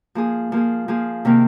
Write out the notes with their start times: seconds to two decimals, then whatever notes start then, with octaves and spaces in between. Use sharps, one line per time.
0.15 F3 A#3 G#4
0.52 F3 A#3 G#4
0.88 F3 A#3 G#4
1.25 C3 D#3 A#3